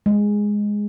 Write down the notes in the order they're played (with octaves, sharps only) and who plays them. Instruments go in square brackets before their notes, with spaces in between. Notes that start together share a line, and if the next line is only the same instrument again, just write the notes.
[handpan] G#3